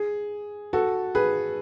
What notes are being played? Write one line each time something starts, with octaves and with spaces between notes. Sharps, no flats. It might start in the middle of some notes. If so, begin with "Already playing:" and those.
Already playing: G#4
F#4 A4
G#4 B4